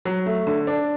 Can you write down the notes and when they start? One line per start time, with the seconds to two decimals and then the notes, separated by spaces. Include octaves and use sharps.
0.05 F#3
0.26 A3
0.47 D3
0.67 D4